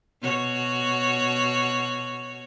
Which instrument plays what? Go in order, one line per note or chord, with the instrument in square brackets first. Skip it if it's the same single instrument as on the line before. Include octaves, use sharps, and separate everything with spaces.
[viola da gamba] B2 F#4 C#5